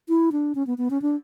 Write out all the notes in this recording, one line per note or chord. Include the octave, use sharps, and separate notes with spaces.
E4
D4
C#4
B3
B3
C#4
D4